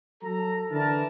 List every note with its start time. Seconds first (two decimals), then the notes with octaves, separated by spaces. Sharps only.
0.23 F#3 A4 A#5
0.71 D3 E3 A#4 A5